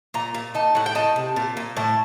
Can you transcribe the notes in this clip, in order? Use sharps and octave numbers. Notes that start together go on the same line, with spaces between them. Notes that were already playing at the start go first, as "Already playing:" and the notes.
A#2 A#5
A#2
D#4 A5
A2 F#5
G5
D#4 A5
C3
A#2
A#2
A2 A5